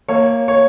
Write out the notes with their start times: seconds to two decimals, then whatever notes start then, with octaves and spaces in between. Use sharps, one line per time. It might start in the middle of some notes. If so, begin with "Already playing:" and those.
0.09 A#3 C#5
0.48 C#5